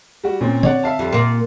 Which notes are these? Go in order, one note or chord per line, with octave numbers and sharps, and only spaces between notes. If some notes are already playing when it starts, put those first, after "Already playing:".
G3 F#4
A#2 C4 C#4
D3 C4 C#5 D5 F#5
E5 F5 A5
F2 G3
A#2 A#3